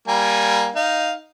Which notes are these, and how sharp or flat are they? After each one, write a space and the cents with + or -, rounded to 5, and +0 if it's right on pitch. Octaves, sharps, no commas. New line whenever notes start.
G3 +0 A#3 +10 G#5 +0
D#4 +0 F5 +0